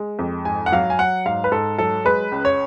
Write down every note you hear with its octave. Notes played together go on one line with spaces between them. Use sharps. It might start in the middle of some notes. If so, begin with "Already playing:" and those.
Already playing: G#3
F2
G#2 G#5
F#5
F#3 F5
G#5
F#3 F#5
G#2 F5
B4
G#2 A4
F#3 A4
G#3 B4
C#2
C#5